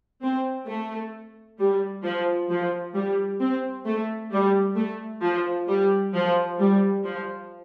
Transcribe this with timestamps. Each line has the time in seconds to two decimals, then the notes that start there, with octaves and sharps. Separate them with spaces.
0.22 C4
0.67 A3
1.59 G3
2.04 F3
2.49 F3
2.95 G3
3.40 C4
3.86 A3
4.32 G3
4.76 A3
5.23 F3
5.68 G3
6.13 F3
6.59 G3
7.04 F3